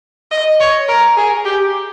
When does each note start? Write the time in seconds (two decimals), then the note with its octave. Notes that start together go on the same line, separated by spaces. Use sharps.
0.31 D#5
0.60 C#5
0.88 A#4
1.17 G#4
1.45 G4